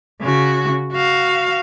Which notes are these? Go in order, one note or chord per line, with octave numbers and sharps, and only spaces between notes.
C#3 F#4
F#4 F5